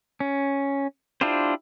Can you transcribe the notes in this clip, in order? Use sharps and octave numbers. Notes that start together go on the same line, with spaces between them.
C#4
D4 E4 F4 G4 C5